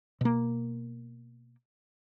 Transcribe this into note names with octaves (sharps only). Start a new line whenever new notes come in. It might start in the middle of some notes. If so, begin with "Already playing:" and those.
B2 A#3